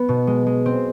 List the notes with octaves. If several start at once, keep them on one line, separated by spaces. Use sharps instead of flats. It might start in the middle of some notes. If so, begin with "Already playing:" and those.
Already playing: B3
B2
G#3
G#3
C4